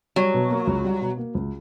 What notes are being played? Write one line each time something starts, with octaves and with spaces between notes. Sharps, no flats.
F#3 G3
B2
A#3
C#2
G3
B2
A#3
C#2